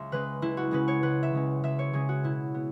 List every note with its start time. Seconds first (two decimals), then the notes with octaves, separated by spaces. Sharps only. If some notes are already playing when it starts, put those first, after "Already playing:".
Already playing: C#2 E5
0.12 C#3 G#3 C#4 B4
0.42 C#2 E4
0.57 F#4
0.71 C#3 G#3 C#4 B4
0.88 C#5
1.03 C#2 B4
1.23 E5
1.33 C#3 G#3 C#4
1.64 C#2 E5
1.79 C#5
1.93 C#3 G#3 C#4 G#4
2.09 F#4
2.23 B2 E4
2.54 B3